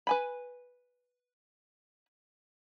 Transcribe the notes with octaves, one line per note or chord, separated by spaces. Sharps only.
B4 G#5 B5